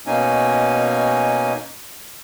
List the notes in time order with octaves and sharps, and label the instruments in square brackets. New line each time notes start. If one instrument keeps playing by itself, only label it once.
[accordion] B2 A#3 C#4 D#4 G#5